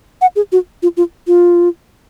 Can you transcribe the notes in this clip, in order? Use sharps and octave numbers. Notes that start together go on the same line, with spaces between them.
F#5
G#4
F#4
F4
F4
F4